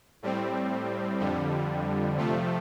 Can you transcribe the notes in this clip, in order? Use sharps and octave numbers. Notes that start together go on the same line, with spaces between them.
A2 G3 C4
F2 D3 G3
C3 F3 A3